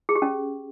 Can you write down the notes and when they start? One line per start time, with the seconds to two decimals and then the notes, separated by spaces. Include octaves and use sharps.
0.09 G#4
0.15 G4
0.22 C#4